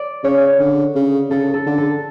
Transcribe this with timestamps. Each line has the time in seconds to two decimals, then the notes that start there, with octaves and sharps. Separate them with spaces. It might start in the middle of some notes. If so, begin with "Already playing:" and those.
Already playing: D5
0.24 C#3 C#5
0.59 D3
0.95 C#3
1.30 C#3 A4
1.54 A4
1.66 D3
1.78 A4